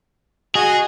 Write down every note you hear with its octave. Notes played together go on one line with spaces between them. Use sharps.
F#4 G#4 D#5